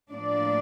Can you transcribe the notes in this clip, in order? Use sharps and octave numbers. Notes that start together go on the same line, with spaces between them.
A2 F3 A#3 D4 D5